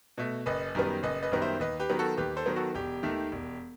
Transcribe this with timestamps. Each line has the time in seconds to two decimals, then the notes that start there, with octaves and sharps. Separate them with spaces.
0.18 B2 A3
0.46 F#1 B4 D#5
0.75 F#2 D#3 G3 B3
1.03 F#1 B4 D#5
1.23 B4 D#5
1.32 F#2 D#3 G3 B3
1.42 C5 E5
1.60 D#2 B4 D#5
1.80 G4 B4
1.89 D#3 F#3 B3
1.99 F#4 A4
2.17 D#2 G4 B4
2.37 A4 C5
2.46 D#3 F#3 B3
2.56 F#4 A4
2.75 E1 G4
3.03 D#2 D#3 A3
3.32 E1